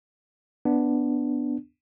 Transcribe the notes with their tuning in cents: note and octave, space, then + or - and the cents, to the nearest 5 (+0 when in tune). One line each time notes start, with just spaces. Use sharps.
B3 +0 D4 +0